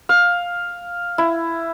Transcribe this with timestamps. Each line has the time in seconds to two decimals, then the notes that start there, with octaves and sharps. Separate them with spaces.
0.09 F5
1.18 E4